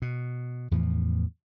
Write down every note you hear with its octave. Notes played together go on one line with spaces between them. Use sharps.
B2
E2 A2 E3 F3